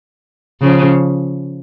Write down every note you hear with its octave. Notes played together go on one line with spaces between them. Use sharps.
C#3 F3